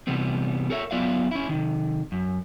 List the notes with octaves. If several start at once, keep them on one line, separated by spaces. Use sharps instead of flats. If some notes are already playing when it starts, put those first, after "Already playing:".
C3 E3 G3 B3 C4
A4 A#4 C#5 D#5 E5
F#3 B3 F4 D5 E5 F5
C#4 E4
C3 D#3
F#2